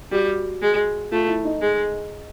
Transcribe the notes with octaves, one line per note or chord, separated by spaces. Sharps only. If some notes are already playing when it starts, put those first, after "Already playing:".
G3 F#4
G#3
A3 F4
E4
D#4
G#3